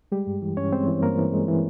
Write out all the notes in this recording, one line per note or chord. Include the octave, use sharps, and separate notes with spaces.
G3 G#3 G4
G2
E3
G2 C#4 C#5
G#3 C4 C5
E3
G2 A#3 A#4
E3
G#3
E3